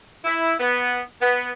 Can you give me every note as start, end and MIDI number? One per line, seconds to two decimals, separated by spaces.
0.25 0.54 64
0.60 1.00 59
1.21 1.51 59